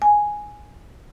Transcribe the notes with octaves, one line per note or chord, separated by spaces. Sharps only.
G#5